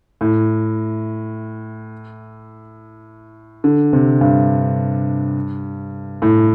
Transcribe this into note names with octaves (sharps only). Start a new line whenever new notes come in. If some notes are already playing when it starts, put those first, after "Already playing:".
A2
D3
C3
G2
A2